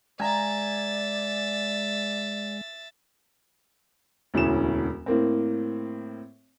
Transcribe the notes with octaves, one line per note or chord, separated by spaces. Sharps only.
G#3 D5 E5 G#5 A#5 A6
E1 D2 A2 C#4 E7
A2 A#3 C4